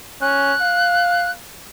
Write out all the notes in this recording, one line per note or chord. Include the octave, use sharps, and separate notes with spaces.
C#4 F#6
F5